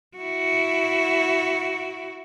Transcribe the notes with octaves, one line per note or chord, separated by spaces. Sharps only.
E4 F#4